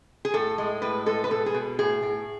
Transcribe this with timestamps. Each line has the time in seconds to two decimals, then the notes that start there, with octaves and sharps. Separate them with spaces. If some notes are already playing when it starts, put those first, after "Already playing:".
0.25 G#4
0.34 A2 A4
0.58 G#3
0.82 A2 B4
1.06 G#3 A4
1.24 B4
1.31 B2 A4
1.46 G#4
1.54 B2
1.79 A2 G#4
2.03 A2